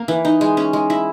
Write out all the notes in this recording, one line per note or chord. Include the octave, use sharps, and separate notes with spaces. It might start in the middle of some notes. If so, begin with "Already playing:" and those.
Already playing: A#3
E3
D#4
G#3
C#4
G#3
E4